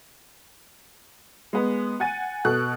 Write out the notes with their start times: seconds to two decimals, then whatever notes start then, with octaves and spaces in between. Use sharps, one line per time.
1.53 G#3 B3
2.00 F#5 G#5 A6 D#7
2.45 B2 A4 F#6